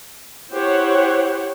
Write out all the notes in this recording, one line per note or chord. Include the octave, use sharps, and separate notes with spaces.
E4 G4 C5 C#5 F#5